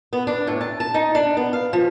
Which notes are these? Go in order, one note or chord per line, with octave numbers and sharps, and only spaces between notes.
B3
D4
A2
A5
A5
D#4
D4
B3
F5
F3